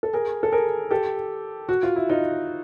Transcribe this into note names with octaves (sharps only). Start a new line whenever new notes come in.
A4
G#4 A#4
A4
G#4 A#4
G4 A4
F#4
F4
E4
D#4 F4